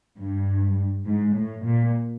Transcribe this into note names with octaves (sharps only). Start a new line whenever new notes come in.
G2
G#2
A2
A#2